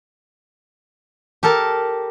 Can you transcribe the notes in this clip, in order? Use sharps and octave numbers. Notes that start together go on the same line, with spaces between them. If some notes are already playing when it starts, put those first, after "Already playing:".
G4 A4 A#4 A5